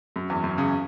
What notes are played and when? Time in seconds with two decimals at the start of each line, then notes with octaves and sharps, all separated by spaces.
0.16 F#2
0.30 E2
0.44 F#2
0.58 C#3